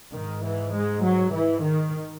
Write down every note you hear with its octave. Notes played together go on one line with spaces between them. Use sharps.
G#2 D#3
E3
G#3
F#3
E3
D#3